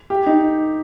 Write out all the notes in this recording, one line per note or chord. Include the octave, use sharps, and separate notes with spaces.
G4
D#4